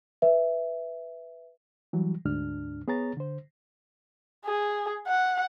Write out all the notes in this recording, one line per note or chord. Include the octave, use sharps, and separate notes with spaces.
B4 E5
E3 F#3 G3
D2 G#2 D4 F6
B3 G#4 C#5 A#5 A6
D3 C5
G#4
F#5